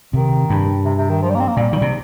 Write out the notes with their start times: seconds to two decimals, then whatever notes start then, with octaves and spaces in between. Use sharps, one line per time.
0.14 C3 D#3
0.50 G2
0.85 C3
0.98 C3
1.09 D#3
1.22 F3
1.30 G3
1.35 A#3
1.40 C4
1.48 A#3
1.57 A#2 G3
1.73 D#3 G3
1.82 C3